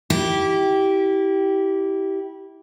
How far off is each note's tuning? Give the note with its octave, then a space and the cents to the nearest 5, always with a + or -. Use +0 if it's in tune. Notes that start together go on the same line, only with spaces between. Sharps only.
E4 -20 G4 -15